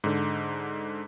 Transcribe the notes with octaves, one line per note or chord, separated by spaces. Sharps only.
G#2 D3